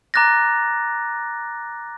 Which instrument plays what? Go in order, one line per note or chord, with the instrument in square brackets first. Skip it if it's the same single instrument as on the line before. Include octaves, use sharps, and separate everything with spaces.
[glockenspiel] A#5 D6 F#6 A6 A#6